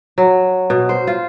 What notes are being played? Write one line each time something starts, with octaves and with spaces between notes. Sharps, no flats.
F#3
B2
C5
F4